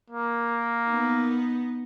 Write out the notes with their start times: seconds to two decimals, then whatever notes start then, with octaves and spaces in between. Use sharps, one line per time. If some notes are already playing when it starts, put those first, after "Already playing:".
0.10 A#3
0.88 B3 D#4